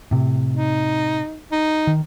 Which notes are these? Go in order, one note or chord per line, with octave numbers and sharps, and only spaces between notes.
A2 C3
D#4
D#4
D#3